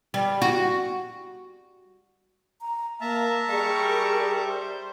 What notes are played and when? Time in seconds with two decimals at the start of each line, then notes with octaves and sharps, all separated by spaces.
0.14 G3
0.42 F#4
2.61 A#5
3.01 A#3 E5 F5 A5 A#5
3.49 G3 G#4 A#4 C#6
4.46 C5